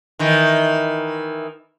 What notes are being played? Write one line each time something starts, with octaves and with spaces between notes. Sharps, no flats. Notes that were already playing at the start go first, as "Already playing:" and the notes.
D#3 E3